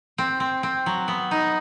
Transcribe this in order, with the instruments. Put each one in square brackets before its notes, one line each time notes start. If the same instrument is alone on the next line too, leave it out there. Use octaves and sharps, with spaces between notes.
[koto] C4
C4
C4
F#3
B3
D#4